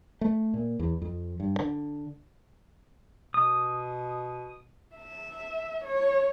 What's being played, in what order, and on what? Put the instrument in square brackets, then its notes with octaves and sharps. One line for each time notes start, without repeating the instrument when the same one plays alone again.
[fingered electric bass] A3
A#2
E2
F2
G2
D3
[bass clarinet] B2 [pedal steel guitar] D#6
[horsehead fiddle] E5
C#5